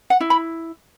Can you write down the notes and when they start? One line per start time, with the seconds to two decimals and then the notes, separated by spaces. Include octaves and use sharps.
0.10 F#5
0.20 E4
0.30 B5